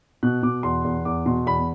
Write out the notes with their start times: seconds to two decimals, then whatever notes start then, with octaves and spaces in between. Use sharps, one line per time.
0.23 B2 F#6
0.43 B2 D6
0.63 E2 C6
0.84 E2
1.05 E2 D6
1.26 B2 C6
1.46 E2 B5